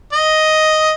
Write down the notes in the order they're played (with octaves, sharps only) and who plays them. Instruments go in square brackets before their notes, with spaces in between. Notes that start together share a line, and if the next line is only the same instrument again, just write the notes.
[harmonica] D#5